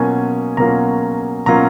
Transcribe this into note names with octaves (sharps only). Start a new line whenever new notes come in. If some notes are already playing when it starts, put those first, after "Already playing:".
Already playing: B2 F#3 A#3 C#4 F4 G#5
B2 F#3 A#3 C#4 F4 A#5
B2 F#3 A#3 C#4 F4 A#5